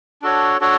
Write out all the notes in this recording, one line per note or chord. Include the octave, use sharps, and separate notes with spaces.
D4 F#4 A4 C#5
D4 F#4 A4 C#5